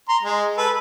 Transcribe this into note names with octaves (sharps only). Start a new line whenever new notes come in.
A#5 C6
G#3
A4 B4